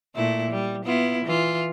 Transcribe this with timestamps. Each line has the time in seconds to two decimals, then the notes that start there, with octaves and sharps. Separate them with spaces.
0.16 A#2 A3 E4
0.51 G3
0.85 B3 E4 F4
1.26 E3 F4